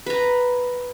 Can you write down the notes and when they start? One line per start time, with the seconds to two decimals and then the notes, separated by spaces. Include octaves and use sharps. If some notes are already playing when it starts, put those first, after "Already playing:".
0.06 B4 A#5